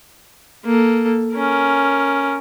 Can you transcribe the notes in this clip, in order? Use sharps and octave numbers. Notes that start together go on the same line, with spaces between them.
A#3 A4
C#4 A#4